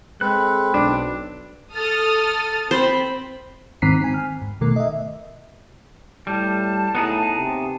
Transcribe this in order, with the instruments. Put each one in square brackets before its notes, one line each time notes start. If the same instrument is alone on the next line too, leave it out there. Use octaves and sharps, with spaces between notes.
[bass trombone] G#3 [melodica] C4 B4 [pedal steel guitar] A4 F#6
[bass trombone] B1 [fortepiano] D4
[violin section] A4 D#6 F6 [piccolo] A6
[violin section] C4 [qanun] C5 [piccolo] B5
[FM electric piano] G#2 D#3 C4 A#5 B6 C7
C4 G#5
F6
G#2
B2 D#3 A3 A#4
D#5 E5
[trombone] A2 [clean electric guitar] G3 [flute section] A5
[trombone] A2 [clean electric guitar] B3 D#4 G#4
[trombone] C3